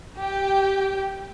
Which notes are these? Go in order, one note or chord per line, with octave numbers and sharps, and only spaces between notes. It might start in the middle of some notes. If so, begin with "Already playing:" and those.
G4 G5